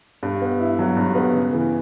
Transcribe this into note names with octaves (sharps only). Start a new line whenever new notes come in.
G2
B3
E4
F#3
G2
B3
C#3
E3